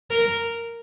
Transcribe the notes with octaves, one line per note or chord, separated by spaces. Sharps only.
A#4